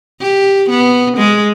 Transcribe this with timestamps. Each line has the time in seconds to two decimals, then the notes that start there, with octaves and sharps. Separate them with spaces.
0.21 G4
0.69 B3
1.17 G#3